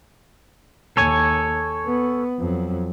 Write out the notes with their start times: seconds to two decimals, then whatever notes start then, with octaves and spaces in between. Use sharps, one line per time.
0.97 D#2 A4 C#5 G#5
1.86 B3
2.40 F2 F#3